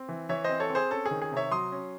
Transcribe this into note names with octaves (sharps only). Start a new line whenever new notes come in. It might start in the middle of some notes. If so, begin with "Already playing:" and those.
Already playing: C4
E3
E3 C#5 E5
C4 C5 D#5
A4 C#5
C4
G#4 C5
C#4 A4
G#4
D#3
G#4
C3
C#5 E5
F#3 C6 D#6
C#4